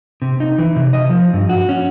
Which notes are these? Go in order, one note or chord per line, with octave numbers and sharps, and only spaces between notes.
C3
D#4
E3
C3
D#5
F3
G2
F#4
C#4